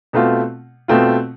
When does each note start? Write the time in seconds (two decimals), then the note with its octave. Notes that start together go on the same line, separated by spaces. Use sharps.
0.13 B2 A3 C4 F4
0.88 B2 A3 C4 F4